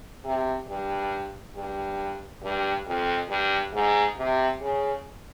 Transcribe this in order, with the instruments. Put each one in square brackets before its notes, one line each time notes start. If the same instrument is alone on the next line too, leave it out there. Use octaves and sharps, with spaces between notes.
[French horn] C3
G2
G2
G2
F2
G2
G#2
C3
C#3